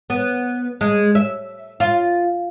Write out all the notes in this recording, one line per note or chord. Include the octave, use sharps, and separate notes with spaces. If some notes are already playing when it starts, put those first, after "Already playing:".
B3
G#3
E5
F4